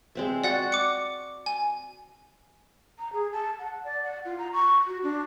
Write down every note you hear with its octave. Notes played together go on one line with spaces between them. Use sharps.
G#3 C4 E5
F#4 D5 F#5 A6
D6 C#7
G#5
A#5
G#4
A5
F#5
D5
F#5
F4
A#5
C#6
F#4
D4